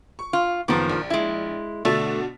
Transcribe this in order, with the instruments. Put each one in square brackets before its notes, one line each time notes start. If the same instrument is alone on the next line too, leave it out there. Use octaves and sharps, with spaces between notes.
[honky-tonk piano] C#6
[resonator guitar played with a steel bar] F4
[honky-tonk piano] F#1 B3 D6 [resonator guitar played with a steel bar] D#3 F3
[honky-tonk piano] A#1
[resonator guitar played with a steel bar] G#3 E4
[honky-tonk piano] B2 D3 D4 [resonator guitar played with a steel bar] A3